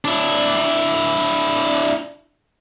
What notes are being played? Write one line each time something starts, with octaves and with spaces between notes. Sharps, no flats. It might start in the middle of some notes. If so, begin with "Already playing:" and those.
D4 E4